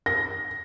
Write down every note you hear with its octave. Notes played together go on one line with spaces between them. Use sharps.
A#6